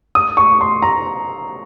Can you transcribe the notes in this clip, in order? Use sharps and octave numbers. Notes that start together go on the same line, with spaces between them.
D#6
C#6
C6
A#5